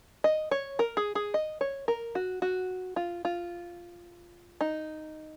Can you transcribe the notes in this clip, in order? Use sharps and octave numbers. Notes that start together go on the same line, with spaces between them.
D#5
C#5
A#4
G#4
G#4
D#5
C#5
A#4
F#4
F#4
F4
F4
D#4